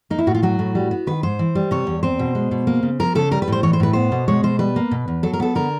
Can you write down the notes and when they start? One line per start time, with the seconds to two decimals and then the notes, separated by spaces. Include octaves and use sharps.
0.10 A#3 D#4
0.19 E4
0.27 A2 F#4
0.35 F4
0.43 F#3 F#4
0.59 A2
0.75 G3
0.91 B3
1.07 D#3 B4
1.23 G#2 C5
1.39 E3
1.55 G3
1.71 C3 C#5
1.87 E2
2.03 C4 C5
2.19 B2
2.35 G#3
2.51 B2
2.67 A#3
2.83 C#3
3.00 F3 A#4
3.15 C#3 A4
3.31 G3 A#4
3.42 B4
3.48 A2 C5
3.63 E3 C#5
3.73 C5
3.80 A2 B4
3.93 B3 C5
4.12 B2
4.28 G#3 C#5
4.43 B2 C5
4.59 G3 B4
4.76 A#3
4.91 B2
5.08 E2
5.23 F#3 A4
5.33 A#4
5.40 B3 A4
5.55 D3 A#4